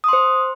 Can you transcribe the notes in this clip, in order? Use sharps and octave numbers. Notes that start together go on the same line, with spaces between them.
C5 C6 D#6